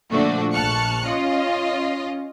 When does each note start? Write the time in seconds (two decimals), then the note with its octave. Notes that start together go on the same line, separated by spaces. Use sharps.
0.10 A#2 D3 F3 A3 D4 F#4
0.53 A#1 A5 C#6 F6 F#6 C#7
1.05 C#4 F4 D#5